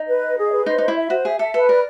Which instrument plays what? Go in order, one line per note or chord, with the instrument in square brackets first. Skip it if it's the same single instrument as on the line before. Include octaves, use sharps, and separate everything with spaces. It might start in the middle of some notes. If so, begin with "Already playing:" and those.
Already playing: [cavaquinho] D#4
[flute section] B4
D#5
G#4
B4
[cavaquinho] D#4 [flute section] C5
[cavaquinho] D#4 [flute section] C5
[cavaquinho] E4
[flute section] E5
[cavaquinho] F#4 [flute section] C5
[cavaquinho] G#4 [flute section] E5
[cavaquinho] A4 [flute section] E5
[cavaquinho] A4 [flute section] B4
[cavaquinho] A#4 [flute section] D5